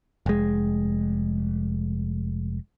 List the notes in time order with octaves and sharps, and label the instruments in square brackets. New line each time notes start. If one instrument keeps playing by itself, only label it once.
[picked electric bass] F1 G#3